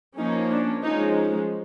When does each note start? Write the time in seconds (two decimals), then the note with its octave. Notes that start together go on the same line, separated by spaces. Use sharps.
0.18 F3 A#3 C#4 D#4
0.51 D4
0.83 F3 G#3 C#4 D#4
1.16 D#4